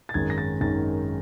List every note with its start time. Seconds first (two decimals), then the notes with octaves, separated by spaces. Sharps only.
0.09 A6
0.14 G#1 F#2 D#3 G#3 G#6
0.30 A#6
0.38 A6
0.60 G#1 F#2 D#3 G#3 A6